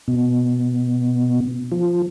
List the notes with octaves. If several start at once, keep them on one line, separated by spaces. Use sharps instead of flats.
B2
F3